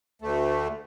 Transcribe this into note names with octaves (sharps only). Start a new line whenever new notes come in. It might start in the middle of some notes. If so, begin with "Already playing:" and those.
D2 A3